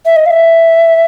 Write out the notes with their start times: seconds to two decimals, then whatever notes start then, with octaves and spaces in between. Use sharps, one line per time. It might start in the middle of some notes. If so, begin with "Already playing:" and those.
0.06 E5
0.16 D#5
0.26 F5
0.31 E5